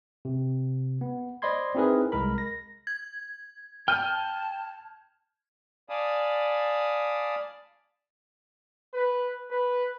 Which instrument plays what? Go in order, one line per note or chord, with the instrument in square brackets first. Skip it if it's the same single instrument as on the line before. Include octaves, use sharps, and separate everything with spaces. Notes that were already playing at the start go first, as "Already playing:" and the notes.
[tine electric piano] C3
B3
C5 D5 D#5 B5 C6 G#6
C4 D#4 E4 G#4 A#4 B4
C2 G#3 A#4 B5
A#6
[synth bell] G#6
[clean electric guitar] G5 [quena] A5 [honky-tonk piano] F6 G6 D#7
[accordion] D5 F5 G#5 A5 B5 D#6
[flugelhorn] B4
B4